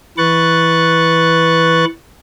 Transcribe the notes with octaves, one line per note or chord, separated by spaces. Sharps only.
E3 B4 C#6 F#6 A6